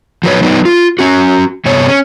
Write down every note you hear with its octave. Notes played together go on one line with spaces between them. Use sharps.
F3 F#3 B4 C#5
F#3 B3 D#4 B4 D5
F4
C#4 F#4
G2 C3 B3 C#5
C#4